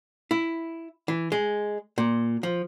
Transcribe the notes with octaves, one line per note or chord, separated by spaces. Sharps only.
E4
E3
G#3
A#2
F3